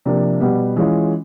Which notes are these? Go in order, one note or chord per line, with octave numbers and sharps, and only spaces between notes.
C3 F3 A#3 D4
B2 G3 B3
E3 G#3 C#4 F4